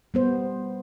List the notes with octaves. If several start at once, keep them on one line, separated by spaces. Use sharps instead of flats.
G3 B3 C5